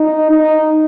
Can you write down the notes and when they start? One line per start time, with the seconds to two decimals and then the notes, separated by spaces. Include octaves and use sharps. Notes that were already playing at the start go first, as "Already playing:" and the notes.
Already playing: D#4
0.30 D#4